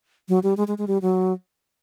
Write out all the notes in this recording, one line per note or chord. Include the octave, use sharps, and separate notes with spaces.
F#3
G3
G#3
G#3
G#3
G3
F#3